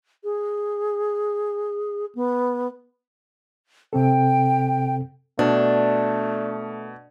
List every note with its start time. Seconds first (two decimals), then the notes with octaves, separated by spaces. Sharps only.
0.24 G#4
2.15 B3
3.93 C3 C4 A4 G5
5.39 B2 A3 D4